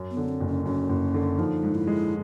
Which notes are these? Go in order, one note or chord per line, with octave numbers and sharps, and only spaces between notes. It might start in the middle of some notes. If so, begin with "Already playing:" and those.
Already playing: F#2
B3
D3
C4
F#1
C#4
F#2 C#4
F#1
D3
F3 D#4
G#2
E4
G#3